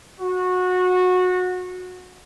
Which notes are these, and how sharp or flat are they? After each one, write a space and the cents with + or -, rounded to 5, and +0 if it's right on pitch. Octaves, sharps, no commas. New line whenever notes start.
F#4 -20